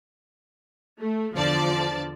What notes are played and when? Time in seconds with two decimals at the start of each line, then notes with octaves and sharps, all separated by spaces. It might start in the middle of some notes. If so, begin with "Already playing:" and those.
1.01 A3
1.34 E2 D3 F3 D5 A5 A6